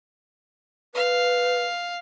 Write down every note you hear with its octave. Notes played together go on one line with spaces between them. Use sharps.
B4 F5